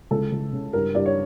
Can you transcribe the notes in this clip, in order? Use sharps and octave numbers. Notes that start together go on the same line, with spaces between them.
C#2 A4
C#2
C#3
G2 A#4
G2 D5
C#5